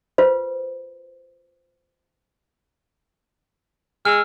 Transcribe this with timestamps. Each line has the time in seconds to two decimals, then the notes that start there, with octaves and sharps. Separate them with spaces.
0.18 F4 B4 C5
4.05 G#3 E6 F6